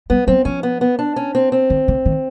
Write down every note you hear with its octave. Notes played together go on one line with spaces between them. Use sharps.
G3 B3
F#3 C4
F3 C#4
B3
B3
D4
C#4
C4
C4
D#3
D3
D#3